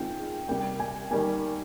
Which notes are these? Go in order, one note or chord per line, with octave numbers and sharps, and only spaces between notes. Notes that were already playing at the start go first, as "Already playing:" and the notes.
Already playing: D#3 G#3 C4 F4 G5
C3 G3 A#3 G5
G#5
D#3 G3 A#3 G#5